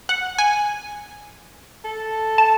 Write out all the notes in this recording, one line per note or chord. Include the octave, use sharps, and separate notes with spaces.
F#5
G#5
A4
A5